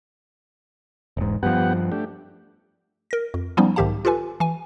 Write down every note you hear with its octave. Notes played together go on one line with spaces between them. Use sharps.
E1 G#2
G2 F3 B3 G4 F#5
A3 D4 G4
A#4 A#6
F2
F3 G3 B3 C#4 D#4
B1 G#2 D#3 G4 F5 A5
F4 G4 A4 B4 G#5
E3 G#5